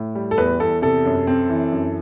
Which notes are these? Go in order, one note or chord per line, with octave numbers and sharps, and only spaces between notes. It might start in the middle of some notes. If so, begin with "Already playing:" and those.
Already playing: A2
G3
A4
E2 B4
E2 A4
C3 A4
F#2
C4
E3
F#2